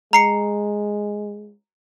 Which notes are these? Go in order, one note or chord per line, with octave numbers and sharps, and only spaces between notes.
G#3 A#5 C7 C#7